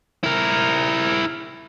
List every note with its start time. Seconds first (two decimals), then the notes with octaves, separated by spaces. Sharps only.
0.24 E4 A#4